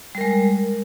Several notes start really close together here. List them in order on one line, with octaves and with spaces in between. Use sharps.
G3 A#4 G#3